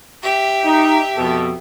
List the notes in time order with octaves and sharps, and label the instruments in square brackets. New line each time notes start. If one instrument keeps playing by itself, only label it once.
[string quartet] G4 E5
[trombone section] D#4
F2 B2 A4